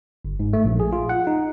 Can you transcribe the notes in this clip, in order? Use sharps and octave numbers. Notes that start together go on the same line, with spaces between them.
G1
G#2
A3
A#1
G#4
F4
F#5
D#4